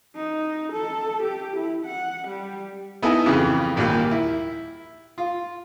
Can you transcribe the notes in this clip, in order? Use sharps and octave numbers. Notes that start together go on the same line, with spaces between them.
D#4
A4
G4
E4
F#5
G3
B3 D#4 E4 A4 G#5
F2 C#3 E3
A#1 D#2 A#2 G3 A#3 F6
E4
F4